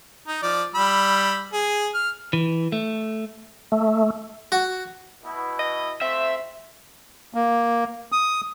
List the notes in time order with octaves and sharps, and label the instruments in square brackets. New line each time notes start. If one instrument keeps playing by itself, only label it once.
[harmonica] D#4
F3 D5
G3 B5 E6
G#4
F6
[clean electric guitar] E3
A3
[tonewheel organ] A3
[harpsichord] F#4
[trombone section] B2 E4
[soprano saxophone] D#5
[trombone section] A3 F4 C5 [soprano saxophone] C4 [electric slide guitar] E5
[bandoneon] A#3
D#6